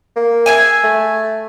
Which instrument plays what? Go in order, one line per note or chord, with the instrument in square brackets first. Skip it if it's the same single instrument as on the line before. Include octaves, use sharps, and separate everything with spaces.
[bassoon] A#3
[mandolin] G#4 E5 G#5
[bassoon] A3